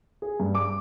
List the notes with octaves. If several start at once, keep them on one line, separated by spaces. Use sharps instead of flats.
G#4
G2
D6